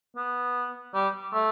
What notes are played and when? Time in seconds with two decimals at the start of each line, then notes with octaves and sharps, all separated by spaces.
0.16 B3
0.94 G3
1.33 A3